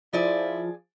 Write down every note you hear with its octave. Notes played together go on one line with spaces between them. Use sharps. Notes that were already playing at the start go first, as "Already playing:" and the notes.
F3 E4 G#4 D5